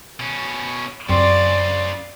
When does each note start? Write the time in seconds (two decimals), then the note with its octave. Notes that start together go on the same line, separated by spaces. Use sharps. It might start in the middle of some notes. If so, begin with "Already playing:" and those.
0.20 B2 C#4
1.09 F#2 C#3 C4 F4 D5